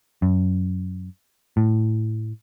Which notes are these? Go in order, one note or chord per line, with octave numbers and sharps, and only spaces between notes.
F#2
A2